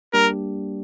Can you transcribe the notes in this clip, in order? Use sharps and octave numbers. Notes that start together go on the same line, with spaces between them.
G3 A#3 D4 G4 A#4